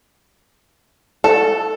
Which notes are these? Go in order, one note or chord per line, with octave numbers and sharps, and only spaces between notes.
A4